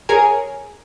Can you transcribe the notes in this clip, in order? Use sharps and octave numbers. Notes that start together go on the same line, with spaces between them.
G#4 A#4 C#5 G#5